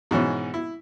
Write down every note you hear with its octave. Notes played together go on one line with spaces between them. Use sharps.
G#2 B2 E3 C#4
E4